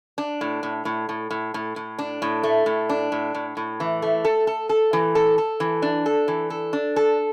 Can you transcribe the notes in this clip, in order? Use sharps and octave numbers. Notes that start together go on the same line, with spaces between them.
D4
A2
A2
A2
A2
A2
A2
A2
D4
A2
A3
A2
D4
A2
A2
A2
E3
A3
A4
A4
A4
E3
A4
A4
E3
D4
A4
E3
A4
D4
A4